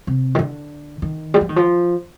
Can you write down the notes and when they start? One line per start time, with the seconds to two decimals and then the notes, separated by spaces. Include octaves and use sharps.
0.07 C3
0.35 D#3
0.39 D3
1.02 D#3
1.34 G3
1.41 F3
1.49 D#3
1.56 F3